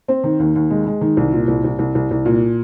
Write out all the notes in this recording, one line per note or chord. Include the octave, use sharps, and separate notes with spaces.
C4
D#3
D#2
D#2
G#3
G#3
D#3
C2
A#2
C2
C2
C2
C2
C2
A#2